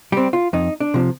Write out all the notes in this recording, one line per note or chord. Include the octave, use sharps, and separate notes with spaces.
G3 C4 G4
F4
F2 D#4
D4
C3 F3